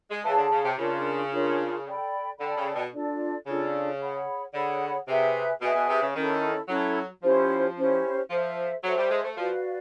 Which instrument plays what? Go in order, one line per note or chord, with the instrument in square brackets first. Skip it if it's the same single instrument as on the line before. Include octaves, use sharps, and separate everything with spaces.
[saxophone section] G#3
[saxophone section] E3 [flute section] G#4 C#5 F5 A5
[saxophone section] D3
C#3
C3
[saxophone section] C#3 [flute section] D4 F4 A#4 C#5
[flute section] D4 F4 A#4 C#5
A4 D5 G5 B5
[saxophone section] D3 [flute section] A4 D5 G5 B5
[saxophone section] C#3
B2
[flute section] D4 F4 A4 D5
[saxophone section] C#3 [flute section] D4 F4 A4 D5
[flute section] G#4 C#5 F#5 B5
[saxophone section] D3 [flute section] G#4 C#5 F#5 B5
[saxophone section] C3 [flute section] G#4 B4 E5 G#5
[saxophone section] B2 [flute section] G#4 B4 E5 G#5
[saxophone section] B2
C3
C#3
[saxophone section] D#3 [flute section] C#4 E4 A4
[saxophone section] F#3 [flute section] C#4 E4 A4
[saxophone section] F3 [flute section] C#4 E4 G4 C5
[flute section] C#4 E4 G4 C5
[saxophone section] F3 [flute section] A4 C5 E5
[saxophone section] F#3 [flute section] A4 C5 E5
[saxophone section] G3
G#3
A3
[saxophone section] F3 [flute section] F#4 B4 D5 F5